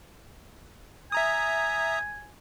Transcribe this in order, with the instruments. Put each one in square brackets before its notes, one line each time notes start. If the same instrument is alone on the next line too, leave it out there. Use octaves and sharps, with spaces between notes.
[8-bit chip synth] E5 A#5 D#6 [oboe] G#5